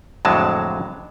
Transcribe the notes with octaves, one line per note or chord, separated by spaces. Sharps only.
F2 A2 D3 F#3 G#3 A5